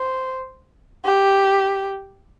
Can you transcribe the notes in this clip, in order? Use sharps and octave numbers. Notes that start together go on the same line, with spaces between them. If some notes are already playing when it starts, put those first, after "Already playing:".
Already playing: C5
G4